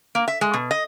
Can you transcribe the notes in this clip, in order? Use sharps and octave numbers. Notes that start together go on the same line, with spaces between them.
A#3
E5
G#3
B2
D#5